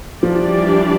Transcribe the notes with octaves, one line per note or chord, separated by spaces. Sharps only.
E3 F3 G3 D4 G4 D5